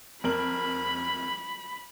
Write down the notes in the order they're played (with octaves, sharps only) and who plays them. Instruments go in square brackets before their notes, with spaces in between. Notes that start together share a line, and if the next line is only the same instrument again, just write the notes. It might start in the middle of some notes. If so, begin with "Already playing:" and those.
[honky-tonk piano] F2 A#4 F#7 [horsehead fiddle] B5